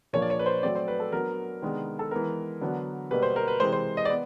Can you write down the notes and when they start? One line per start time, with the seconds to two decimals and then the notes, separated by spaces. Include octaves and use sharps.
0.13 A#2 F3 A#3 D4 C#5
0.22 D5
0.30 C#5
0.39 B4
0.46 C5
0.63 F#3 A3 C4 D5
0.75 C5
0.88 B4
1.00 A4
1.12 F#3 B3 D4 A#4
1.62 C3 D#3 G#3 B3 D4
1.99 A4
2.11 E3 G#3 B3 A#4
2.61 D3 F#3 B3 D4
3.11 B2 G3 A#3 B4
3.22 C5
3.36 A#4
3.48 B4
3.60 C3 E3 G#3 C5
3.73 C5
3.97 D#5
4.05 D5
4.10 B3